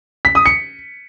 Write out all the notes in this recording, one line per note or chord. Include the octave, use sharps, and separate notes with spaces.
B6
D#6
C#7